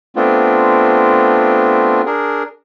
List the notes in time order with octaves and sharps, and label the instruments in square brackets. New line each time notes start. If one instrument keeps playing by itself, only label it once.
[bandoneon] A3 B3 C4 D4 F4
D4 G#4 A#4